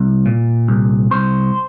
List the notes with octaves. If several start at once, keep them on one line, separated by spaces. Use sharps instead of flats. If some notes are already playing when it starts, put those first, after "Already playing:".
Already playing: C2
A#2
C2
C2 C5